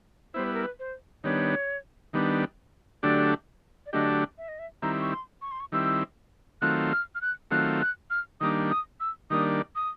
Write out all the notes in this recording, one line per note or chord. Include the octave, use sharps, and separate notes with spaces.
G3 B3 E4 C5
B4
A#4
B4
C5
D#3 G3 B3 D4 C#5
D#3 G3 B3 D4
D3 F#3 A3 D4 G4 D5
D5
D3 F#3 A3 D4 G4 D#5
E5
D#5
E5
D#3 G3 C4 E4 A#5
C#6
C6
C#6
C6
C#6
D#3 G3 C4 E4 E6
D#3 F#3 A3 C4 F4 F#6
F6
F6
F#6
D#3 F#3 A3 C4 F4 F#6
F#6
F6
D#3 G3 A#3 D4 D#6
D#6
E6
D#3 G3 A#3 D4 D#6
D#6